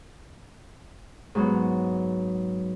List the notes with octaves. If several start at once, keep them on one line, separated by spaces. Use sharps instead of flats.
G#2 F#3 B3